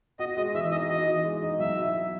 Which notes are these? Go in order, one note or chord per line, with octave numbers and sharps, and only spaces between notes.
F#4 D#5
G#3 D#5
E3 E5
D#4 D#5
F#4 D#5
E3
G#3
D#4
F#3 E5
E4
E4